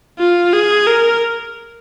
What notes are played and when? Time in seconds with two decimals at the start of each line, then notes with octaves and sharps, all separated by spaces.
0.19 F4
0.53 G#4
0.87 A#4